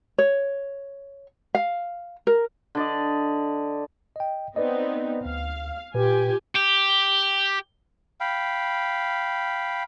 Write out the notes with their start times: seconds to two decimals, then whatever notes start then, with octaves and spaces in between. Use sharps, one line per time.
0.18 C#5
1.55 F5
2.27 A#4
2.75 D3 D5 D#5
4.16 D#5 G5
4.56 B3 C4 D#4 B4 D5 D#5
5.25 D2 F5
5.94 A#2 F4 G4 B4 G#5
6.55 G4
8.20 F5 G5 B5